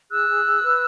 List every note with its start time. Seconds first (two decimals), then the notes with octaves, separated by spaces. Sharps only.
0.10 G#4 E6 F#6
0.28 G#4
0.44 G#4
0.63 B4